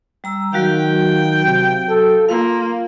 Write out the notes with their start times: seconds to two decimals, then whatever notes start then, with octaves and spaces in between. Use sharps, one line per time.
0.24 G3 A#5 E6
0.53 D#3 F#3 F#4 F5 G5
1.45 C3
1.89 A4
2.29 A#3 F4 F5